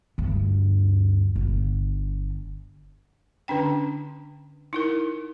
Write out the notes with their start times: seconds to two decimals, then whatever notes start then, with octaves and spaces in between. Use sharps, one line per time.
0.18 D2 G2
1.36 G1 D3
3.48 D3 C#4 D4 G5
4.73 D#4 E4 A#4